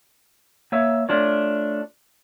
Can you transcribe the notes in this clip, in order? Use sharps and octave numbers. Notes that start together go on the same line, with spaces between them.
A#3 C#5 E5
A3 D4 F4 C#5